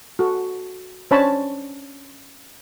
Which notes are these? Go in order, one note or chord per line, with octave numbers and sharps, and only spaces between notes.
F#4 A4
C#4 D4 C5 C#5 A5 B5